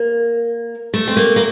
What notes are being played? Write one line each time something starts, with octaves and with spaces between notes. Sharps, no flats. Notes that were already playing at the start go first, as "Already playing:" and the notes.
Already playing: A#3
A3
C4
A#3
A#3